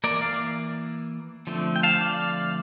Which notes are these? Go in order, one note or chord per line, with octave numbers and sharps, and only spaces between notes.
E3 A#3 A#4 D5
D5 F5
D3 F3 A3 C4
G5
F5 A5
D5 F5